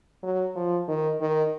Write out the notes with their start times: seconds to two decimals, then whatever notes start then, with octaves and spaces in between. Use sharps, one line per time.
0.23 F#3
0.55 F3
0.88 D#3
1.20 D#3